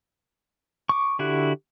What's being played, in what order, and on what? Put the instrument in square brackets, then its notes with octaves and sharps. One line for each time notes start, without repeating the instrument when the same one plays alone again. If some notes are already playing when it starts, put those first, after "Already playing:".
[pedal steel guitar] C#6 D6
D3 E4 F#4 G4 F#6